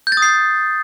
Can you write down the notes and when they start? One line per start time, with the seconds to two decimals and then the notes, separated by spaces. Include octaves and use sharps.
0.07 G6
0.12 A6
0.17 D#6
0.22 C7